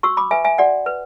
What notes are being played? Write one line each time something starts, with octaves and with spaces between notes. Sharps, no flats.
F#4 C#6 E6
B5 D6
B4 E5 G#5
E5 G#5
F#4 D5 F#5
B4